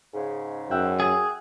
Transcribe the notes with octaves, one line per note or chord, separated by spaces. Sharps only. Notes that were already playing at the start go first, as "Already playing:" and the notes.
G#2 C#3
F#2 E5 F#5 G5
G#4